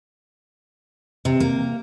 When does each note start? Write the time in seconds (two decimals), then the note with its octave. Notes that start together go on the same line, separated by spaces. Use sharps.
1.25 C3
1.40 A#3